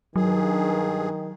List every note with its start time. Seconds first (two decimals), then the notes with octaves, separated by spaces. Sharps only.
0.16 G2 D#3 F#3 G#4